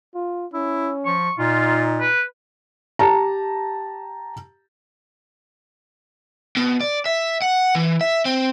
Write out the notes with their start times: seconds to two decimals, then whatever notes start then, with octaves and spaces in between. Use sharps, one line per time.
0.15 F4
0.54 C#4 E4
1.06 F3 C#6
1.39 A#2 D#4 F4
2.00 B4
2.99 G4 A5 A#5
6.57 B2
6.81 D5
7.06 E5
7.42 F#5
7.75 E3
8.01 E5
8.25 C4